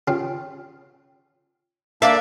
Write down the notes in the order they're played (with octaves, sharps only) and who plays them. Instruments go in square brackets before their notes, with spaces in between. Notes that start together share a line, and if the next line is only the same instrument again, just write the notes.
[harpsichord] C#3 F4 G4
[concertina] A#3 D4 [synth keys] D5 E5 [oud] F5